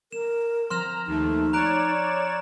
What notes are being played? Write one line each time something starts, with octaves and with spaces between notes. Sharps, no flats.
A#4 E7
F3 C4 A#5 C6 F6 E7
D#2 A3 D#4
C#5 D5 A#5 F#6 D7 E7